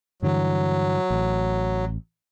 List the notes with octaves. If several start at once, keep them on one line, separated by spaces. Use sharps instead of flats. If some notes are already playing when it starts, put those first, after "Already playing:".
G2 D3 E3 F#3
A1